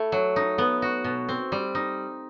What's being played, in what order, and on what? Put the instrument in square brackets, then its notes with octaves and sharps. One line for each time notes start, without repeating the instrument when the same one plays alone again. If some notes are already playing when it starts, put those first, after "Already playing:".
Already playing: [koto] A3 E4
F#3
D#4
B3
F#4
B2
C4
G3
D#4